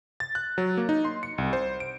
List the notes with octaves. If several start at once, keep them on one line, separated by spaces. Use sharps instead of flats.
A6
F#6
F#3
A#3
D#4
C6
C#7
C2
C5
D7